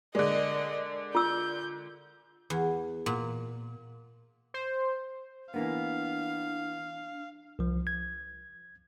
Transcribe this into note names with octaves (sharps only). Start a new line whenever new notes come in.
D3 G#3 A#4 D5 D#5
F4 E6 G6
E2
A#2
C5
E3 A#3 B3 D4 F5
C2 F3
G#6